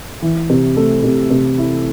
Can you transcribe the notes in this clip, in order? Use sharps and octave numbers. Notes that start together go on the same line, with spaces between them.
E3
C3
A3
C3
C3
E4